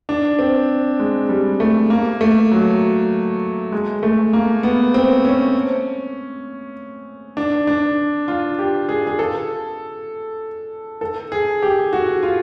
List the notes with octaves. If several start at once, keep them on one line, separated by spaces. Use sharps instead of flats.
D4
C4
G#3
G3
A3
A#3
A3
F#3
G#3
A3
A#3
B3
C4
C#4
D4
D4
F4
G4
G#4
G#4
A4
A4
G#4
G4
F#4
F4